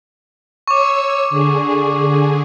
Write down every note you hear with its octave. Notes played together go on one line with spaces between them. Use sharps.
C#5 C#6 D6 E6
D3 G#4